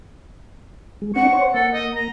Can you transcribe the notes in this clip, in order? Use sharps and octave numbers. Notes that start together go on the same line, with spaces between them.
G#3
C4 D4 F#5 C#6
C5 C#5
A#3 A4
D#5
A#5